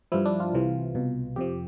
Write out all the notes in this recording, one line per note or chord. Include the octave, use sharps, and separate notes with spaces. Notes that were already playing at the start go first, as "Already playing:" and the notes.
G2 F3 E4
D4
F4
C2 C3 E3
C2 B2
F2 C3 F3 G4